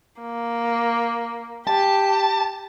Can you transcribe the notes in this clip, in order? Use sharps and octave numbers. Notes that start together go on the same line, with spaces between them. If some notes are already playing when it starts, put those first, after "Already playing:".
A#3
G4 A5